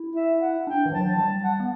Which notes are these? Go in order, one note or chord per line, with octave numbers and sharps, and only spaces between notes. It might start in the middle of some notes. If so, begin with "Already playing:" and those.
Already playing: E4
E5
F#5
D4 G5
E3
F#3 A5
G3 A5
F#5
B3